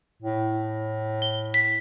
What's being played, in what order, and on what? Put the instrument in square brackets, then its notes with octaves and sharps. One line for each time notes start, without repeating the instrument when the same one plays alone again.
[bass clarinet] A2
[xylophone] G7
B6